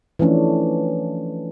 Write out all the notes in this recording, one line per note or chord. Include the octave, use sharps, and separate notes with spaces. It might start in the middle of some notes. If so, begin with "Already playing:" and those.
E3 F3 A3 C#4 D4